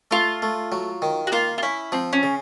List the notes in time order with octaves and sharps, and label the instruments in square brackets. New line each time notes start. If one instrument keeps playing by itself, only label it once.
[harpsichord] A3 [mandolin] F4
[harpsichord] A3
F#3
D#3
[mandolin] F#4
[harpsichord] A#3 [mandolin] F4
[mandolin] F4
[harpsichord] C#4 [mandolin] E4
[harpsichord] F3 [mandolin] C4
[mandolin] C#4
[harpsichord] C#3